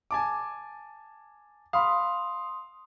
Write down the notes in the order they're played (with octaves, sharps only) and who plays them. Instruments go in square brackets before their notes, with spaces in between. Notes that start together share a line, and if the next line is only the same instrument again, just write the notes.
[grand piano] G#5 A5 D6
[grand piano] F5 B5 [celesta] C6 D#6